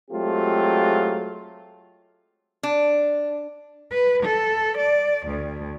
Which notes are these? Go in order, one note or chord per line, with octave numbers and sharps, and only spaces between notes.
F#3 G#3 A3 C4 F4 G4
D4
B4
A4
D5
D2